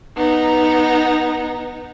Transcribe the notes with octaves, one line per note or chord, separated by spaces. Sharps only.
B3 D#4